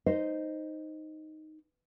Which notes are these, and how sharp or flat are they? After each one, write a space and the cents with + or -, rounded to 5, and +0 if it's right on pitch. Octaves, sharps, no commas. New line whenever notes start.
D#4 +0 C5 +0 D#5 +0